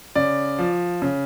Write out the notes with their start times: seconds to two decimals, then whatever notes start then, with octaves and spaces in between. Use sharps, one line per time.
0.15 C#3 D5
0.59 F3
1.02 C#3